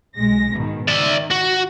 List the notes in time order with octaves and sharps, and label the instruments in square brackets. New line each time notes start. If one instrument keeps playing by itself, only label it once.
[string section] B1 G#3 A#6
G#2 B2 D#3
[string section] D#3 [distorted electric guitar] D5 E5
[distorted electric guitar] F#4